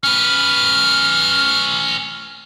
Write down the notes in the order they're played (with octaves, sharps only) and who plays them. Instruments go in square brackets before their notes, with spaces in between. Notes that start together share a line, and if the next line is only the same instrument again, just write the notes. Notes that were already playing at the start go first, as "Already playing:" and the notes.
[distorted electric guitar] C#4 B4 [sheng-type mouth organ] F6